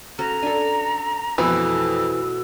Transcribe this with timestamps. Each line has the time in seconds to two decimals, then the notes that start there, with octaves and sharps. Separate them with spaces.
0.19 C#4 F#4 A4 A#5
0.43 D4 A4 G#5
1.38 F2 B2 E3 A3 G#5 E6